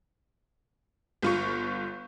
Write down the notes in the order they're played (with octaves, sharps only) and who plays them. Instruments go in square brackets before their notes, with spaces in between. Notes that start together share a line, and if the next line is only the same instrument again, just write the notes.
[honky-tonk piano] G1 F4 C#6